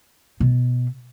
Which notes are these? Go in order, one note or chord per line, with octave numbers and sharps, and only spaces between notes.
B2